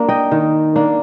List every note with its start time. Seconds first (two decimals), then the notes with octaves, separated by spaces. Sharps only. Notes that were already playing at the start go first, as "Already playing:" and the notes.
Already playing: A#3 D4
0.09 D#5 G5
0.32 D#3
0.76 A#3 D4